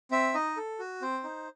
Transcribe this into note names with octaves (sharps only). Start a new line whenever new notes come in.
C4 E5
D#4 D#5
A4
F#4
C4 C5
D#4